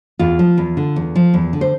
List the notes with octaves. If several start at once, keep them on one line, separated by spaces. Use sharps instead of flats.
E2 F4
F3
E2
D3
E2
F3
E2
D3
C5